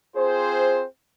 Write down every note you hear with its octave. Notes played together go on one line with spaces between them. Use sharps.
C4 F4 G#4 C5